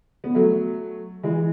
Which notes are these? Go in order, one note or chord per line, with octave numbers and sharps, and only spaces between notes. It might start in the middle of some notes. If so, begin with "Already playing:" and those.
B3
F#3 A3
E3 G#3